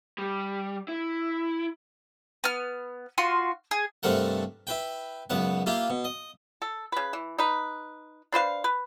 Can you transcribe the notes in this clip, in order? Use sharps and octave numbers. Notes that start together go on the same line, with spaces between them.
G3
E4
B3 F6
F4 F#4 C6
G#4
G2 C3 A3 C4 A#4 F#5
E4 B4 G5
C#2 F#2 B3 F#5
A#3 E4 F4 G4
B2
D#5
A4
C#3 B4
E3
D#4 B4
D4 B4 C5 F5
B4